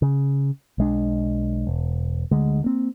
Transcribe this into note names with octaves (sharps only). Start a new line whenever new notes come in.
C#3
B1 G#3 D4
E1
D2 D3 G#3
A#3 C4